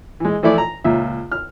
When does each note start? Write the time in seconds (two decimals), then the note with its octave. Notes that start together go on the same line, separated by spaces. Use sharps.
0.20 E3 G#3
0.43 E3 F3 A3 E4 D5
0.58 A#5
0.84 C#2 A#2 E5
1.32 F6